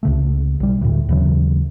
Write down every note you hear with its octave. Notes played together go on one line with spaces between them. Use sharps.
C#2 C#3 A3
B1 G3
D2 A2
D#2 C#3 E3 F#3